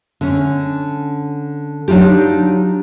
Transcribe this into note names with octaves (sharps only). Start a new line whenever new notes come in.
D3 C#4
F#3 D4 D#4 F4 G4